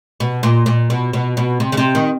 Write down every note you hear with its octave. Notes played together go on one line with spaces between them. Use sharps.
B2
A#2
A#2
B2
B2
B2
C3
C#3
C3
D#3